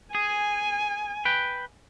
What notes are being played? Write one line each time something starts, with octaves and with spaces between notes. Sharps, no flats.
G#4 G#5
B4 G5